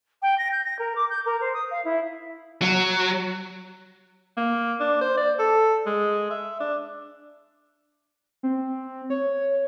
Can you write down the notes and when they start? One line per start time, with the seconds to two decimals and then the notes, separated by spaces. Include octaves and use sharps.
0.22 G5
0.38 A#6
0.51 G6
0.64 A#6
0.79 A#4
0.95 D6
1.09 G6
1.25 A#4
1.41 C5
1.53 D#6
1.70 F5
1.84 E4
2.62 F#3
4.37 A#3
4.80 D4
5.01 C5
5.17 D5
5.39 A4
5.86 G#3
6.30 E5
6.60 D4
8.43 C4
9.10 C#5